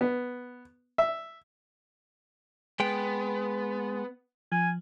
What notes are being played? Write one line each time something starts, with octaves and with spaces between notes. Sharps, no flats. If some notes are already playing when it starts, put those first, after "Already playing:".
B3
E5
G#3 B3 G5
F3 G#5